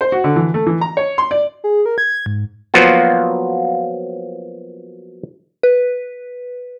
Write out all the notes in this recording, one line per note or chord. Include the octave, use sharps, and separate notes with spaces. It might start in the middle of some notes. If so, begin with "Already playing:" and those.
C5
F#4
D3
E3
A3
E3
A#5
C#5
C6
D5
G#4
A#4
G#6
G#2
F3 F#3 A#3 B3 F4 F#4
B4